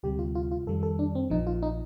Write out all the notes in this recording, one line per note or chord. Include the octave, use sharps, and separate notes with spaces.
D2 C3 G3 G4
F4
F4
F4
F2 D#3 G3 A4
A4
D4
C4
A#1 A#2 F3 D#4
F4
D#4